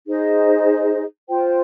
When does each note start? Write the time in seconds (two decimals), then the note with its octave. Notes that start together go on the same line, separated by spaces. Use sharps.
0.06 D#4 G#4 C5 D#5
1.29 F4 C5 G5